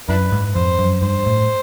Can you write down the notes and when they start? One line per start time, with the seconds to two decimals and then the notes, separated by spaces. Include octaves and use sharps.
0.09 F#2 D4 E4 B4
0.32 G#2
0.55 F2 C5
0.79 F#2
1.02 G2 C5
1.26 A2